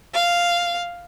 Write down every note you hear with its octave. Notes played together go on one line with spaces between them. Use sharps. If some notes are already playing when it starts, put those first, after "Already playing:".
F5